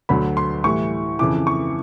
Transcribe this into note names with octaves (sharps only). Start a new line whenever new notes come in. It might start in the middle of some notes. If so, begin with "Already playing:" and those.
D2 D3 F#3 B5
C6
A2 E3 G3 C#6
F2 C#3 E3 D6
C#6